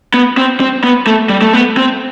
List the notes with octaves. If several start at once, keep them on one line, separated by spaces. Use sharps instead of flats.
B3
C4
C4
B3
A3
G3
A3
B3
C4